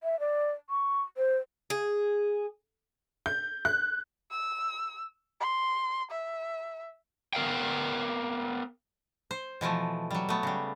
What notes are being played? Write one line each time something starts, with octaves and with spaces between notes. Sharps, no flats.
E5
D5
C#6
C5
G#4
G6
F#6
E6
C6
E5
B3 A#4 F5 G5
C5
B2 E3 F3 A3
F#3 G3
A3 B3
C#3 G3